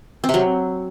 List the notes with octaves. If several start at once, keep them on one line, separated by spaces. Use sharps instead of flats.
C4
C3
F#3